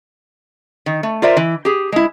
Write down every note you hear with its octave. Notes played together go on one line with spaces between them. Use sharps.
D#3
A3
F4 A#4 C5 D5 E5
E3
G4 G#4
G#3 E4